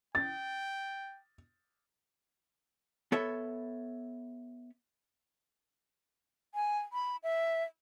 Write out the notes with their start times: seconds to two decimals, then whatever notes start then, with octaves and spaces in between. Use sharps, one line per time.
0.15 G5 A6
3.12 B3 A4 C#5 E5
6.55 G#5
6.93 B5
7.23 E5